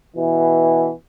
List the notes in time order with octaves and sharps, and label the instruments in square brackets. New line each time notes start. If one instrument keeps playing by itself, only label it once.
[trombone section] B2 E3